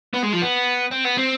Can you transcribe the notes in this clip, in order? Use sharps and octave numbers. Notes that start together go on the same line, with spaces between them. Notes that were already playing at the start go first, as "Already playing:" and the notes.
B3
G#3
F3
B3
C4
B3
C4